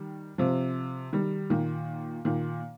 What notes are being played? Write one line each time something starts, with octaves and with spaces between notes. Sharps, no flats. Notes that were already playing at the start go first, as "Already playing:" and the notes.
Already playing: D#3 G3
C3 F3
D#3 G3
A#2 D#3
A#2 D#3